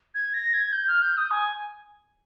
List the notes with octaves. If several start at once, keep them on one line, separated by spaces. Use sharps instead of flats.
G#6
A#6
G#6
G6
F6
G6
D#6
G#5